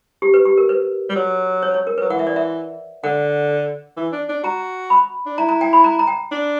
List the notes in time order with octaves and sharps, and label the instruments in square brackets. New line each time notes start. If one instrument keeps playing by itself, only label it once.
[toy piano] G4
B4
G4
A#4
B4
[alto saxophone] G3
F#3
[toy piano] C#5
C#5
A#4
[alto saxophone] F#3 [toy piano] B4
[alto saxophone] E3 [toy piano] F#5
[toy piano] E5
D5
E5
[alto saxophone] D3 [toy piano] F#5
[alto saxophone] E3
D4
D4
[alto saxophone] F#4 [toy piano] A#5
[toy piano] B5
[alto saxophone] D4
[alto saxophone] E4 [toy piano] A#5
[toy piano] A#5
G5
B5
A#5
A#5
G5
[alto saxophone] D4